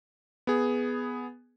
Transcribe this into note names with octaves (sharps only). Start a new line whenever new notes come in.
B3 G#4